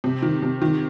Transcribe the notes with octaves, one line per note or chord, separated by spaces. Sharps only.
C3
D#3
C3
D#3